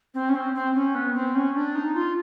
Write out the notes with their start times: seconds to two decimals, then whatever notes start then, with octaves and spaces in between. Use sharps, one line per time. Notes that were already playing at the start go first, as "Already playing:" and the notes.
0.14 C4
0.29 C#4
0.35 C4
0.54 C4
0.74 C#4
0.95 B3
1.14 C4
1.35 C#4
1.55 D4
1.75 D#4
1.95 F4